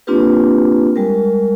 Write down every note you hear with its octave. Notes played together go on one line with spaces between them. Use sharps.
A#3 C4 D4 F4 G4 B4
G3 G#3 A#4